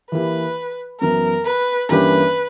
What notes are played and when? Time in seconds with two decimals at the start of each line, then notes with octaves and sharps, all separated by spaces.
0.12 E3 A#3 E4 G4 B4
1.00 F#2 E3 B3 A#4
1.45 B4
1.89 G2 E3 A#3 C#4 G4 B4